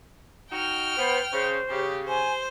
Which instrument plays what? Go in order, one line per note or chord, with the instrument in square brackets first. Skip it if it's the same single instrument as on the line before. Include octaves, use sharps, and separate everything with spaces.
[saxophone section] D#4 F#4 [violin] G5 F6
[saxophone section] B3 [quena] C5
[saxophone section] C#3 [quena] C5
[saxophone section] C#3 [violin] G4
[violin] C5 [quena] G#5